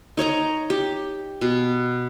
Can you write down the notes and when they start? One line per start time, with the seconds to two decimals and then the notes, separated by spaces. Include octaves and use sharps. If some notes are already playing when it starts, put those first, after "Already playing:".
0.17 D#4 C#5 D#5 A#5
0.70 G4
1.41 B2